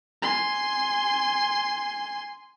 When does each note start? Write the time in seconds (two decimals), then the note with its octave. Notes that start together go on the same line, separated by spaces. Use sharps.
0.23 G#5 C6